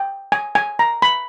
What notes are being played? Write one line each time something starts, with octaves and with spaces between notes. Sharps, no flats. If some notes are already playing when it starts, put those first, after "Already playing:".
Already playing: G5
G#5
G#5
A#5
B5